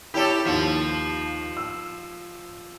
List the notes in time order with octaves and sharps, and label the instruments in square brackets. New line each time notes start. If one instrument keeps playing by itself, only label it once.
[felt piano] E4 C#5 [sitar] G4 A4
[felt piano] D#2 B6 [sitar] F3
[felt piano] E6